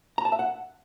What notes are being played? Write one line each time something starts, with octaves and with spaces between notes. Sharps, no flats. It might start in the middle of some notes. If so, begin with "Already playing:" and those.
A#5
A5
E5
F#5